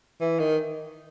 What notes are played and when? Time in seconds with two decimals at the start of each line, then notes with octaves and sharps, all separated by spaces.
0.21 E3
0.39 D#3